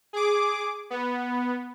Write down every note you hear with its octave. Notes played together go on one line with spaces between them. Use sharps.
G#4 D6
B3